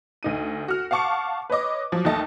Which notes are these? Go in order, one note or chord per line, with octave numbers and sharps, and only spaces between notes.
D2 D#4 D#7
F#4 F6
F5 F#5 A5 C#6 D6 C#7
B4 C#5 D#5 D6
F3 F#3
A#1 D#2 A3 D#5 A5